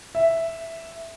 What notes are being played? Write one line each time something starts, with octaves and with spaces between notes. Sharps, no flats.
E5